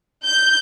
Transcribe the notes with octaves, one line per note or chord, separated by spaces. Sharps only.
G6